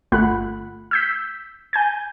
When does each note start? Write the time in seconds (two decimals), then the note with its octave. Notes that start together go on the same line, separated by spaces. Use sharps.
0.12 G1 A3 F4 F#5 B5 F#6
0.91 E6 G6 B6
1.73 G#5 G6 G#6